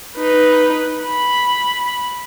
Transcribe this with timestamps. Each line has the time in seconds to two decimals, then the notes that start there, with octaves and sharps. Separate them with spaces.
0.16 D#4 B4
1.03 B5